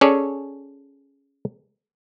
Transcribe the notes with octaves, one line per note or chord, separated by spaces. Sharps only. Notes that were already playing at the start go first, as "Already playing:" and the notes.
C#4 G#4 A4 C#5 D5